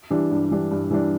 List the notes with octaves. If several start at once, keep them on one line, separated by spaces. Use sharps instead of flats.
E3 G3 D4
G2
E3 G3 D4
G2
E3 G3 D4